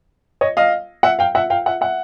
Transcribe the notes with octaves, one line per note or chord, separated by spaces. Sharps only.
C#5 D#5
D#5 F5
E5 F#5
F5 G5
E5 F#5
F5 G5
E5 F#5
E5 F#5